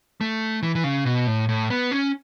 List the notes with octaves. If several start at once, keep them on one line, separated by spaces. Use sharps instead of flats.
A3
E3
E3
C#3
B2
A2
A2
B3
C#4